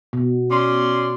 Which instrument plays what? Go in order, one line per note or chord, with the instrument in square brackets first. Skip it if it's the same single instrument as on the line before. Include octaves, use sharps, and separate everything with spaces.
[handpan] B2
[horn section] C#4 D5 C6